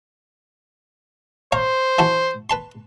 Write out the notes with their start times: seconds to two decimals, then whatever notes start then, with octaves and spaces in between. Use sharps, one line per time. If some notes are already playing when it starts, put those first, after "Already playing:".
1.52 C5 C#5 F5 A#5
1.99 E3 F#4 A4
2.50 B4 A5 C6